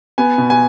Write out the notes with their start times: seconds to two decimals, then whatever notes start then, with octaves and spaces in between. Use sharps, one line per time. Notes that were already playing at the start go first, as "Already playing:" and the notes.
0.18 B3 G#5
0.38 B2
0.50 G#5